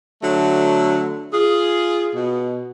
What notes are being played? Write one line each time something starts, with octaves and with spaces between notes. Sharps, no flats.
D3 F#3 A3
F4 G#4
B2